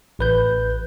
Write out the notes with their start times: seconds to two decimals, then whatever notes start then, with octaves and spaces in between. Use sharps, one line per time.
0.19 A1 B4 G6